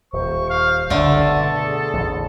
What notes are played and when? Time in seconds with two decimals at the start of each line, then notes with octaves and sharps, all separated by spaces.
0.13 D#1 C5 C#6
0.50 F5
0.90 F#1 C#2 G2 D3 A3 A4
1.26 B2
1.56 G#4
1.93 A1 E2